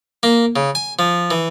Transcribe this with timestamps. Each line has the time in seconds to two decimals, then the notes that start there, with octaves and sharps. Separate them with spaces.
0.23 A#3
0.56 C#3
0.75 G#5
0.99 F3
1.31 E3